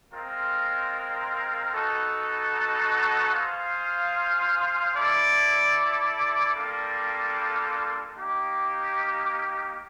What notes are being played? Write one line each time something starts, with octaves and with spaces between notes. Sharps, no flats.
G#3 C4 F4 A#4
B3 D#4 F#4 A4
F4 G#4 C5 F5
E4 A4 D5
G3 A#3 D4 F4 A4
A#3 D#4 G4